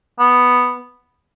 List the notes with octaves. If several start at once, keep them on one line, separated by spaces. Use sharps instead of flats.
B3